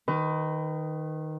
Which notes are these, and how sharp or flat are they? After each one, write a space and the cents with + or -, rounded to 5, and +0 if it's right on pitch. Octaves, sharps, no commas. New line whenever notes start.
D#3 +0 B4 +30